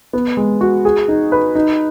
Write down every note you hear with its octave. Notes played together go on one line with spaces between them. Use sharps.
B3
G#3
F#4
G#4
D#4
B4
D#4